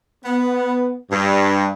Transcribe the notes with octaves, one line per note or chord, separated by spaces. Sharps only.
B3
G2